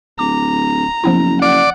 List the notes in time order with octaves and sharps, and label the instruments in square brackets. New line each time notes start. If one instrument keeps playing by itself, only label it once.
[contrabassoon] D1 [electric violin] A#5 [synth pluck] D6
[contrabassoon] F#1 [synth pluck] F3 B3 E4
[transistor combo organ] D5 [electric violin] F#5